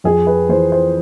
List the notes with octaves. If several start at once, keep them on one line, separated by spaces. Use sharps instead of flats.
F2 G#4
B4
E3 C5
C5